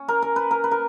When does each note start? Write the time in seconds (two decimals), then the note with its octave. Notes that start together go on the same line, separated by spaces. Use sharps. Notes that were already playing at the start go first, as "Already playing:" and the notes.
Already playing: C#4
0.08 A#4
0.22 A#4
0.36 B4
0.51 A#4
0.64 B4
0.71 A#4